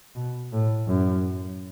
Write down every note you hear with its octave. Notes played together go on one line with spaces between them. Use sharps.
B2
A2
F#2